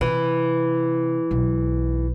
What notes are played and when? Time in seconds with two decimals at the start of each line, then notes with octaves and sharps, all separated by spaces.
0.01 C3 E3
1.31 B1